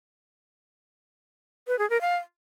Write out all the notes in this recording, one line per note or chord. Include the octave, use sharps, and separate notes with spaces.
B4
G#4
A#4
F5